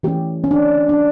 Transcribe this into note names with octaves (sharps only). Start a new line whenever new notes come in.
E3 A3 C#4 G4
C#4
D4
D4